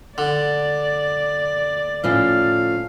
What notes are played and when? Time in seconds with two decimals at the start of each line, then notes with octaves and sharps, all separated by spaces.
0.18 D3 D5
2.04 A2 F3 C#4 F5